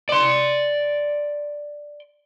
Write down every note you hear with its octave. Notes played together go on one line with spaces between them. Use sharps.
D5 C6